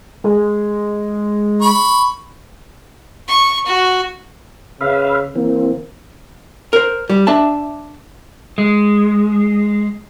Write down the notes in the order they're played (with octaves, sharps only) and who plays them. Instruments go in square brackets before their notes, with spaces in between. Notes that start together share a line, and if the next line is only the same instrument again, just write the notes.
[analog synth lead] G#3
[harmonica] B5 C#6
[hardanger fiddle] C#6
F#4
[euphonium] C#3 [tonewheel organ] B4 E5 F5
[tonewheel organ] E3 C4 [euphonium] A#3
[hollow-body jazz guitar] A#4 C5
G3
D4 E5 A5
[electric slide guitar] G#3